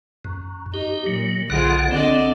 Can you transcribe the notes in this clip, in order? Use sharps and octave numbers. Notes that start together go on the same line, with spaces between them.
F#2
D#4 G4
A#2 F#3
B1 D3 F4 G#4 C5 F#5
D3 C4 D5 D#5